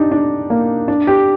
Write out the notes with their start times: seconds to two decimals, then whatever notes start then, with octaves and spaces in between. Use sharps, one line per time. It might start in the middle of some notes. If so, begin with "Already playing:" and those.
Already playing: D4 D#4 G4
0.11 D4
0.50 A#3
0.88 D4
1.07 G4